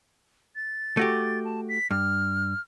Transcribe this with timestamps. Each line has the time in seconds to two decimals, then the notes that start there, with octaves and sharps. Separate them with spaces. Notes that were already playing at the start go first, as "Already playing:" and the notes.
0.56 A6
0.97 A3 F#4 G4
1.45 A5
1.69 B6
1.91 G2 F6